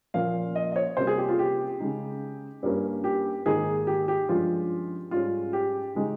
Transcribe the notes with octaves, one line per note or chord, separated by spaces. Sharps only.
A#2 F3 A#3 C#4 F5
D#5
D#5
C#5
C3 G3 A#3 C#4 C5
G#4
G4
F4
G4
C#3 G#3 D#4
G2 G3 A#3 C#4
G4
G#2 D#3 A#3 D#4 G#4
G4
G4
G2 F3 G#3 C#4 F4
G#2 G3 C#4 F4
G4
C#3 G#3 D#4